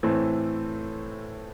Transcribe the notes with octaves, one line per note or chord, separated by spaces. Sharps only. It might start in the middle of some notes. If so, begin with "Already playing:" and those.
A2 E3 A3 C4